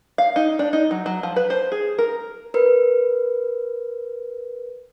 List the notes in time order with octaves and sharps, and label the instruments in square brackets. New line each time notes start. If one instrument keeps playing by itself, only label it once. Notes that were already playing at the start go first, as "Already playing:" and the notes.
[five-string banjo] F5
D#4
D4
D#4
F#3
F#3
F3
B4
C5
G#4
A#4
[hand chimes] A#4 B4